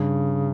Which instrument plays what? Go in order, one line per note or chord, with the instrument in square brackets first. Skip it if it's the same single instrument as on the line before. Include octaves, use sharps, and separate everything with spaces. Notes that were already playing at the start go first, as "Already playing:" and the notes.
Already playing: [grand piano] G2 [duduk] C#3